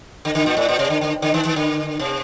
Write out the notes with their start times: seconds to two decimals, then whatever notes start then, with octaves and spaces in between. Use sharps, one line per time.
0.25 D3
0.35 D3
0.46 A#2
0.57 A2
0.69 A#2
0.79 C3
0.90 D3
1.01 D3
1.22 D3
1.34 D#3
1.45 D#3
1.56 D3
1.99 C3